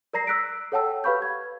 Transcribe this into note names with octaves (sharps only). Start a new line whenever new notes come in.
A#4 D5 A#5 A#6 C7
E6 F#6 B6 D7
A4 C#5 F#5 G5 A5 E6
G4 B4 F5 B5 C#6 G6
G#6